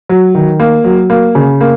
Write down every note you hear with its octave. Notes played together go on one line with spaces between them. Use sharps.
F#3
D#3
A#3
F#3
A#3
C#3
A#3